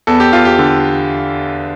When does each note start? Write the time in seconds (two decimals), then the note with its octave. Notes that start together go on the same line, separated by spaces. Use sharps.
0.07 E2 A4
0.20 G4
0.33 E2 F4
0.45 G4
0.59 D3